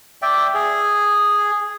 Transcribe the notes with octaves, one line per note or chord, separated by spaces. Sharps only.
D5 E5 G5
G#4